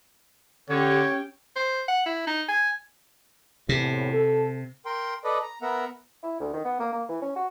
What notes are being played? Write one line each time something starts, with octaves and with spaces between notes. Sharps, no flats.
D3 C#4 G4 C#5 G5
C5
F#5
E4
D#4
G#5
E2 A2 C3
A4
A#4 G5 C6
A4 B4 D5 D#5
A#5
B3 A#4 E5 F#5 A#5
E4
D2
D#3
B3
A#3
A#3
E3
C#4
F#4